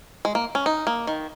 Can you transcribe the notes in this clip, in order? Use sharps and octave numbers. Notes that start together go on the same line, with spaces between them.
G#3
A#3
C#4
D#4
A#3
D#3